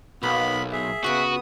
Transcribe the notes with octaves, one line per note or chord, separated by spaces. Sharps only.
B1 A#3 B3 B5
G#4 E5
C#3 B3 F#4 G5 D#6